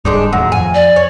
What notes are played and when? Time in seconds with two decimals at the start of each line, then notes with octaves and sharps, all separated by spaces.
0.05 D1 G2 G#3 D4 D#4
0.33 D#2 A2 F#3
0.52 F2 G#5
0.75 D5
0.96 C#5